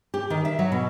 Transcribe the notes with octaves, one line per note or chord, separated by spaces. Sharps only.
G4
D#3
E5
F#3
B2